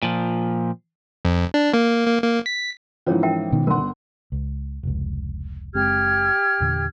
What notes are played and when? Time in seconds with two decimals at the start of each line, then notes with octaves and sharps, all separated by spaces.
0.03 A#2 F3
1.25 F2
1.54 D4
1.74 A#3
2.06 A#3
2.23 A#3
2.46 B6
3.06 G#2 E3 F3 C#4 A#4 C#5
3.23 A#4 E5 G5
3.52 B2 D#3
3.67 G1 A#4 F#5 C6
4.32 C#2
4.83 F1 C#2
5.75 F#1 G#3 C4 G4 F6 G#6
6.60 E2 A#2 D3